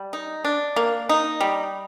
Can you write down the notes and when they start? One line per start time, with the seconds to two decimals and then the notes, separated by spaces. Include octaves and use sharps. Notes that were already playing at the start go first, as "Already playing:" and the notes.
Already playing: G3
0.13 D#4
0.45 D4
0.76 A#3
1.09 D#4
1.41 G3